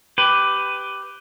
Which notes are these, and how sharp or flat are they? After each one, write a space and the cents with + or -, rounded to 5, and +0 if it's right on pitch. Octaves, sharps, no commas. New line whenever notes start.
G4 +0 B4 +15